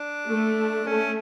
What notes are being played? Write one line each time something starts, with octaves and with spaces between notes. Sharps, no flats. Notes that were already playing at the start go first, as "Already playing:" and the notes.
Already playing: D4
A3
A3 C#4